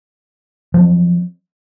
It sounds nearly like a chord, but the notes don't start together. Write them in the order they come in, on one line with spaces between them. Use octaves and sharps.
F3 F#3 C4